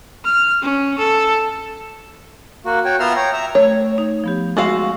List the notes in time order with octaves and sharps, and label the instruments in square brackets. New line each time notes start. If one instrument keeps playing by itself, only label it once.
[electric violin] F6
C#4
A4
[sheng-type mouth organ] A#3 F#4
F#4 C#5 G5
B3 F4 E5 A#5 C6 F6
C#5 G5 A#5
E5 A#5
[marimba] A3 [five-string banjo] C#5
[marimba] D#4
F3 B3 G4
[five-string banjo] G#3 F#4 F5 [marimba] E6